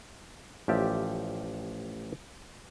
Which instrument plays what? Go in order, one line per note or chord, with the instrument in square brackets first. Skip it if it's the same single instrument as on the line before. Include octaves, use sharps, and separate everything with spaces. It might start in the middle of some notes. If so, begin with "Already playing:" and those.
[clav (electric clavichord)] A1 F3 G4 D5 E5